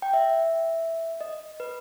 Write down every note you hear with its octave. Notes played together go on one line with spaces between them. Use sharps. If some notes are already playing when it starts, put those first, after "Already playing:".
G5
E5
D#5
B4